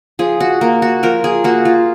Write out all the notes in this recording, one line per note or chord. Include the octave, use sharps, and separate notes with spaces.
F3 G#4
F#4
A#3
F#4
F3 A#4
G#4
A#3 F#4
F4